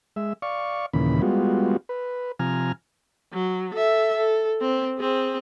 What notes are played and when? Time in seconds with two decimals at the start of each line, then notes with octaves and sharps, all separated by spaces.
0.16 G#3 E5
0.42 D5 F5 C#6
0.93 D#2 A#2 C#3 E3 B5
1.22 G3 G#3 B3 F4 F#4
1.89 B4
2.39 C3 F3 G#5 A#5 F6
3.33 F#3
3.74 A4 E5
4.17 A4
4.61 C4
4.99 C4 G#4